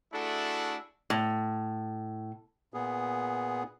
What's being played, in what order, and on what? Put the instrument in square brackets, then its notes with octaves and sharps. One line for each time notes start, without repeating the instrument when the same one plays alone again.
[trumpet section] A3 D4 E4 F#4 G#4 A4
[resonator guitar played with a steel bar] A2
[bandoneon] A#2 B3 G#4